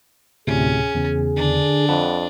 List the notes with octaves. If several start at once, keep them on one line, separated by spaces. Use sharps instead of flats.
D2 A2 C3 C#4 G#4
E2 C#3
D3 D4
F2 F#5 A5 B5